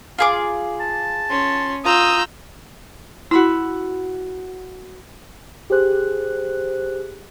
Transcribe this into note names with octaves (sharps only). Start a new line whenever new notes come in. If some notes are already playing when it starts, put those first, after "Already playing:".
F4 G#4 D6
A5
C#4 C6
F4 A#5 D#6 E6 G6
E4 F#4 B5 E6
G4 G#4 C5 F#6